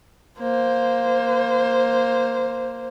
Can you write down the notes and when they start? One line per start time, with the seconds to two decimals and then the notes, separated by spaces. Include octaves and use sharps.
0.39 A#3 C5